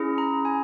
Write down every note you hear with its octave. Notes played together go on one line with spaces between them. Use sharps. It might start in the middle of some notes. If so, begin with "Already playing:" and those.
Already playing: C#4 E4 G#4
A#5
G#5